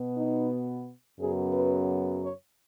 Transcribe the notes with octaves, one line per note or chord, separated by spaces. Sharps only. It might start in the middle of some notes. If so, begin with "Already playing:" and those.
Already playing: B2 B3
D#4
F#2 C#3 F#3 B3 G#4
B4
C#5